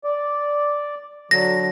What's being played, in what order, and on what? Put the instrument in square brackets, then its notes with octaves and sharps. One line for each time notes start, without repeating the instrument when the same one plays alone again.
[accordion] D5
[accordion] D3 F#3 [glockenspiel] A#6